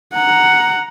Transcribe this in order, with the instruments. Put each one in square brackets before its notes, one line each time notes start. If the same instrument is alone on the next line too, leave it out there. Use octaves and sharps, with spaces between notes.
[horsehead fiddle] F#5 A#5